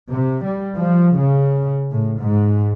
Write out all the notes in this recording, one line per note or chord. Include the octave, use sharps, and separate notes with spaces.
C3
G3
F3
C#3
A2
G#2